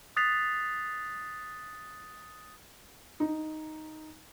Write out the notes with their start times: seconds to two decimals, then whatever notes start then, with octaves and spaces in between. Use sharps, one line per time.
0.17 D#6 F#6 A6 B6 C7 F7
3.20 D#4